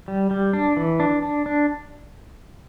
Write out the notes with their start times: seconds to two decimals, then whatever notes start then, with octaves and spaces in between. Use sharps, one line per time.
0.08 G3
0.31 G3
0.53 D4
0.77 E3
1.00 D4
1.22 D4
1.46 D4